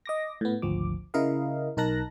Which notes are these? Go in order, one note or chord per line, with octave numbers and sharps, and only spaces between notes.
D#5 D6 A#6
A2 B3
G#1 D2 F3 D6
C#3 E4 A#4 D#5 F5
B1 D#4 A#4 A5 F#6 A#6